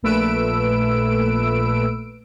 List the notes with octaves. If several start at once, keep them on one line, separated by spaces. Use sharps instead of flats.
A#1 A#2 A3 B4 E6 D7